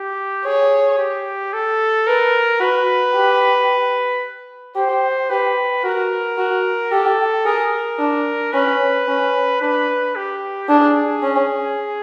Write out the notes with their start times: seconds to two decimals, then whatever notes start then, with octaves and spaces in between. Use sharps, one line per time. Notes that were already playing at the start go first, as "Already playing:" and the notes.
Already playing: G4
0.45 G#4 C#5
0.99 G4
1.53 A4
2.07 A#4 B4
2.60 F#4 B4
3.15 G4
4.76 G4 C5
5.30 G4 B4
5.84 F#4 A#4
6.38 F#4
6.92 G4 A4
7.46 G#4 A#4
7.99 D4
8.53 C#4 B4
9.08 C#4
9.62 D4 B4
10.16 G4
10.69 D4 G#4
11.23 C#4